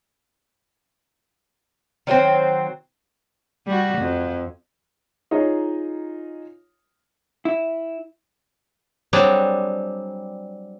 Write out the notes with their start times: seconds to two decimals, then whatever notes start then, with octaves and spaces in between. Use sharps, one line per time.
2.07 D#3 F#3 A3 C4
3.66 G3 F#4
3.98 F2
5.31 D#4 F4 G#4 C#5 D#5
7.45 E4
9.13 F#3 G3 C4 D4 G#4